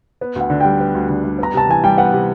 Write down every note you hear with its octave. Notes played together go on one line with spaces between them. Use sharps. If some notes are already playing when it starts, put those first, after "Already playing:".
B3
D2 F#5
D3
G3 G5
B3
D2
D3
G3
B3 A#5
C3 A5
E3 G#5
G3 G5
B3 F#5
C3